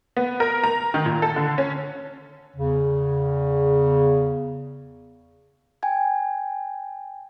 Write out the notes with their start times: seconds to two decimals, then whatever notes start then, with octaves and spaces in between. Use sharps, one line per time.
0.17 B3
0.40 A#4
0.64 A#5
0.94 D#3
1.06 A#2
1.22 A4
1.36 D3
1.58 C#4
2.57 E2 C#3
5.83 G5 G#5 G#6